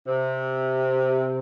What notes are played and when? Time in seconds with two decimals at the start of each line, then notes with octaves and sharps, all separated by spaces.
0.07 C3